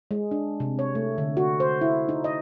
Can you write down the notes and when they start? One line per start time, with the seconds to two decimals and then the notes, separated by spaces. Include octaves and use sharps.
0.11 G#3
0.31 D4
0.60 C3
0.79 C#5
0.95 A3
1.18 D3
1.37 F#4
1.60 C5
1.81 E4
2.09 D#4
2.24 D#5